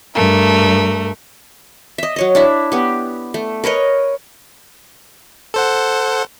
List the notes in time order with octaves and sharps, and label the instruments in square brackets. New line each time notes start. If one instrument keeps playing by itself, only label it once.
[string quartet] G2 A3 A#4
[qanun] D#5 E5
F#3 C#5 D#5
D4 E4 E5
B3 G4
A3
A#4 B4 C#5 D#5
[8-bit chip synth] A4 C5 F#5